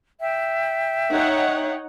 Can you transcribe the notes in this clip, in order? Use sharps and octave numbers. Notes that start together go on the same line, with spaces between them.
E5 G5
D#4 C#5 F#5